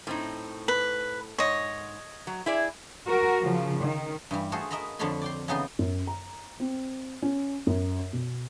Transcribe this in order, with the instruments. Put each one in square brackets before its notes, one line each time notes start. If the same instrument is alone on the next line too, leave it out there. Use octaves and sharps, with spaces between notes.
[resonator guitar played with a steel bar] A2 C4 D#4
[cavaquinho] B4
[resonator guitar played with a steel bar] G#2 [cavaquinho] C#5 D#5
[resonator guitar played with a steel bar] F#3
E4 G#4 D5
[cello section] F#4 A#4
C#3 F3
D#3
[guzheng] G2 E3 G3
A3 F4 F#4 G#4 A4 C5
A#4 D#5 E5 A#5 B5
F2 D3 A4 C#5 B5 C6
D5 G5 C6
C#3 E3 B3 D#4 D#5 C6
[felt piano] F#2
A#5
C4
C#4
F#2
B2